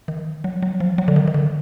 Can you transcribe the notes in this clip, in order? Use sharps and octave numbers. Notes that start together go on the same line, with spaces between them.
D#3
F#3
F#3
F3
F#3
D3
D#3
D#3
D3